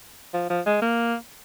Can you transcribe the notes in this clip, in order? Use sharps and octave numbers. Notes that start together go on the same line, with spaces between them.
F3
F3
G#3
A#3